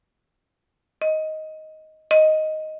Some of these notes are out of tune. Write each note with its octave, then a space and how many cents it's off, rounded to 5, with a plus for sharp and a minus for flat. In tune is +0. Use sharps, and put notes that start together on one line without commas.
D#5 +10
D#5 +5